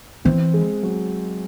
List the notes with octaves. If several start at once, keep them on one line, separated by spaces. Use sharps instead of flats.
E3 C4
G#3
F#3